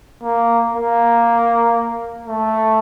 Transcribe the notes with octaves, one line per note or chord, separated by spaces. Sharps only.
A#3
A#3
A3